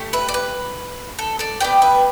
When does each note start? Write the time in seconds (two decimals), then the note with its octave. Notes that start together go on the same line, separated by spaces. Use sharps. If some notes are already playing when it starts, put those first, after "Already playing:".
Already playing: A3 G4
0.13 B4 E5
0.29 D5
0.34 B4
1.19 A4
1.39 A4 D5
1.60 B3 G4 D5 G5
1.82 B4 E5